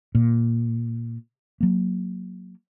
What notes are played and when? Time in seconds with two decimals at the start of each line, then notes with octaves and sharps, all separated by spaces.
0.15 A#2
1.61 F#3 A#3